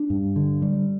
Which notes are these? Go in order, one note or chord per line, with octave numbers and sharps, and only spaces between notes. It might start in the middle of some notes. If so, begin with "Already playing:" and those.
Already playing: D4
G2
D3
G3